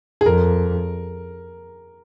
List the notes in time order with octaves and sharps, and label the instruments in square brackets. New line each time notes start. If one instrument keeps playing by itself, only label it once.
[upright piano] G#4
[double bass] F2 [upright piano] A#4